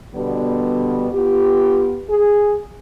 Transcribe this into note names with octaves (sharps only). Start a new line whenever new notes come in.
B2 D3 G3 B3
B3 F4 G4
G#4